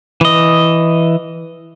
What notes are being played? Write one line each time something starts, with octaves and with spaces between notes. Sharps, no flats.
E3 D#5